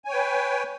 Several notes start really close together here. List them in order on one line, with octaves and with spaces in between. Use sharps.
G#5 C#5 G5 B4